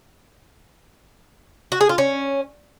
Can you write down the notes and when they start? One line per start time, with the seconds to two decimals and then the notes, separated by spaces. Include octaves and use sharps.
1.72 F#4
1.81 G#4
1.89 F4
1.98 C#4